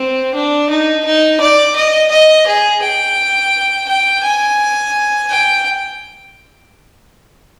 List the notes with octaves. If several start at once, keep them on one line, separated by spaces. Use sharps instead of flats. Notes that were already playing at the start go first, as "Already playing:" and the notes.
Already playing: C4
D4
D#4
D#4
D5
D#5
D#5
G#4
G5
G5
G#5
G5